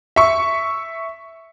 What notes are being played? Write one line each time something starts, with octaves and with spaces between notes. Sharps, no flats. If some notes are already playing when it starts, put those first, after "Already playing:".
E5 C#6